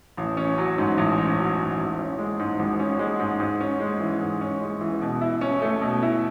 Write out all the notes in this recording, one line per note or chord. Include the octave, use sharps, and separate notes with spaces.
A1
C#4
F#3
G#2
A1
C#4
F#3
G#2
G#1
C#4
G#3
G#2
G#1
C#4
G#3
G#2
G#2
C#4
G#3
E3
G#2
C#4
G#3
E3
B2
E4
C#4
A3
B2
E4